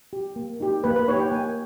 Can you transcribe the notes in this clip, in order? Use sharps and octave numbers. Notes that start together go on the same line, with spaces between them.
G4
A#3
D#4 G4
A#3 B4
B4
D#4 G4 C#5
G5
A#3 G#5